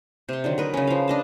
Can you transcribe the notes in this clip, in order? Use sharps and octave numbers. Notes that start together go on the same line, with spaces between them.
C3 C6
D3 D#3 F#3
A#4 B4 D#5
C#3 C#4
F3 F5
D4 D#5 A5